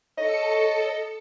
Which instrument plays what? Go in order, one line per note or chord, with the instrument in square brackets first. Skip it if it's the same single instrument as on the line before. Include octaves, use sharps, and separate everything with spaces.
[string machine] A4 C#7 [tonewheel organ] C#5 [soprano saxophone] D#5